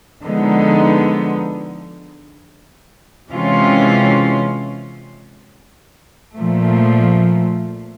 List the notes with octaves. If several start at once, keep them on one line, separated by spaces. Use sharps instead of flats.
D3 F3 G#3 B3 D#4
C3 E3 G#3 C#4 F4
A#2 F3 A3